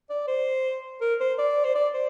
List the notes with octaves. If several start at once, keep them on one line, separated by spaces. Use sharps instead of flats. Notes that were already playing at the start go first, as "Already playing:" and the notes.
D5
C5
A#4
C5
D5
C5
D5
C5